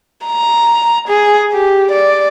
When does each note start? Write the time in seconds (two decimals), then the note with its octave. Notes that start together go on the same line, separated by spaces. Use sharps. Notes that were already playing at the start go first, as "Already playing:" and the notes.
0.26 A#5
1.07 G#4
1.53 G4
1.91 D5